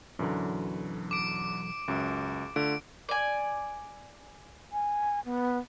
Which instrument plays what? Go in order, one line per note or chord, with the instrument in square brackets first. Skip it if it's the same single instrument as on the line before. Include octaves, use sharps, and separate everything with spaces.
[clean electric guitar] B1 E3 F#3 [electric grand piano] F#2 D3
[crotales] D6 D7
[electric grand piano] C#2 F#2
[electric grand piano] D3 [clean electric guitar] A3 F4 [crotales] D7
[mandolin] D5 G#5
[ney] G#5
B3